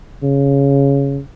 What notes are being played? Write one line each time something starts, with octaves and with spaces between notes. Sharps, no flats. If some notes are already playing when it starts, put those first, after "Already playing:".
C#3